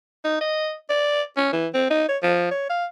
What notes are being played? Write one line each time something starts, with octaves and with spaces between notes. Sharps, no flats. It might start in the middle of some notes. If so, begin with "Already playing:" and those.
D#4
D#5
D5
C#4
E3
C4
D#4
C#5
F3
C#5
F5